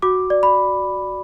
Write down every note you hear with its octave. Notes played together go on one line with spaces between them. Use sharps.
F#4 D6
D5
B5